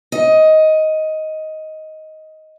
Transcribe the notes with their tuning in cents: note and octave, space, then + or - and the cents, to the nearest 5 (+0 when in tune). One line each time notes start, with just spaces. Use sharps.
D#5 +10